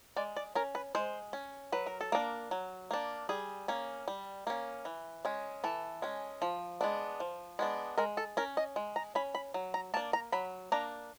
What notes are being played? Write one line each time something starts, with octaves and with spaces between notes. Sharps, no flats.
G#3 D5
D5
C#4 A#4
B4
G#3 C5
C#4
F#3 B4
A#4
A4
A#3 D4 A#4
F#3
A#3 D4
G3 G#4
A#3 C#4
G3
A#3 C#4
E3
G#3 C#4
E3 A4
G#3 C#4
F3
G#3 B3 D4
F3
G#3 B3 D4
G#3 A#4
A4
C#4 A#4
D#5
G#3
A#5
C#4 B5
B5
F#3
A#5
A#3 D4 A5
A#5
F#3 B5
A#3 D4 A#5